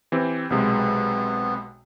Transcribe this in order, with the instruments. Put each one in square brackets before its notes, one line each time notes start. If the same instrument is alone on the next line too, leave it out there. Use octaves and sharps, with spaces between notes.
[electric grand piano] E3 C4 G4
[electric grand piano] B1 C3 G#3 [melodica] B3